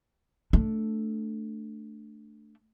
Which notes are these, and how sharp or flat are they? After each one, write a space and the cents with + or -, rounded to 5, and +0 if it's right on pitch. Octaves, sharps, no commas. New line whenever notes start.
A3 +0 D4 +0